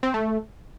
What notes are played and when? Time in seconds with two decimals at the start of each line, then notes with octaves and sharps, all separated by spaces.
0.03 C4
0.14 A3